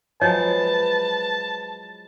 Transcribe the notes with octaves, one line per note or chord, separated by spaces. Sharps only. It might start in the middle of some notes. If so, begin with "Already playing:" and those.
F3 F#3 G#3 B4 C#5 A5